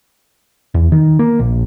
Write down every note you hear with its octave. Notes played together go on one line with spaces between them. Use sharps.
E2
D#3
A#3
A#1